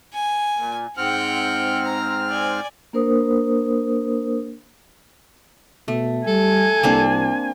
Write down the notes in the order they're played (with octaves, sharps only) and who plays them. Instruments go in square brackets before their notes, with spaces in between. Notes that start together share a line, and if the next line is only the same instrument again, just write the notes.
[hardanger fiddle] G#5
[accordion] A#2
[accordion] G#2 C4 F6 [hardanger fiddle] F#5 G5
[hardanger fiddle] A#5
D5 G#5
[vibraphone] A#3 D4 A#4 C5 D#6
[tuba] B2 [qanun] A3
[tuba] G3 [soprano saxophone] A4 [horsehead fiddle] G#5
[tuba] C2 [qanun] A#3 C4 D4